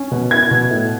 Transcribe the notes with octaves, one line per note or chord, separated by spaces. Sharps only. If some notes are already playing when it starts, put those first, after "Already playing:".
Already playing: C#4
B2
E4 G#6
B2
A2